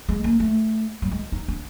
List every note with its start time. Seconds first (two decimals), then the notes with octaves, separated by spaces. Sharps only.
0.09 G#3
0.24 A#3
0.40 A3
1.02 G3
1.11 G#3
1.32 D#4
1.48 D4